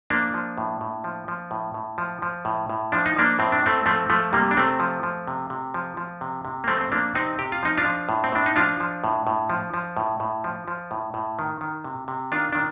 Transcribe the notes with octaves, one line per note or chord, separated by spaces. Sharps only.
F3 A#3 D4
F3
A2
A2
F3
F3
A2
A2
F3
F3
A2
A2
F3 D4
D#4
F3 A#3 D4
A2 C4
D4
A2 A3 C4
F3 A3 C4
F3 A3
C3 G3 A#3
D4
C3 A3 C4
F3
F3
C3
C3
F3
F3
C3
C3
A#3
F3 A3 C4
C4
F3 A#3 D4
C3 C4 D#4
C3 G4
F4
F3 D#4
D4 F4
F3
A2
C4
A2 D4
D#4
F3 D4 F4
F3
A2
A2
F3
F3
A2
A2
F3
F3
A2
A2
D#3
D#3
C3
C3
D#3 D4 F4
D#3 D4